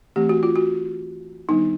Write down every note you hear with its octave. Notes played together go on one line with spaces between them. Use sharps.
E3 A3 C4 G4
F#4
F4
F#4
D#3 G3 B3 D4 D#4